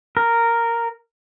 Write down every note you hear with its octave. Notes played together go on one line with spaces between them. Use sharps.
A#4